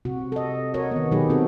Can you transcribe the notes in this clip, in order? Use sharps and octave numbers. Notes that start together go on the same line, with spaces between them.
C3 F#4
A4 D#5
F#4 A#4 C#5 D#5
D#3 B3
B2 F#3 D#4 G4 G#4 B4
C4 F#4 A4